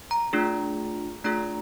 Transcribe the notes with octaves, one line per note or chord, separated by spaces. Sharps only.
A#5
A3 D4 F4 G#4
A3 D4 F4 G#4 A#5